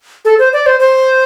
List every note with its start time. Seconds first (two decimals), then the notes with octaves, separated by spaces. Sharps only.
0.25 A4
0.39 C5
0.53 D5
0.66 C5
0.80 C5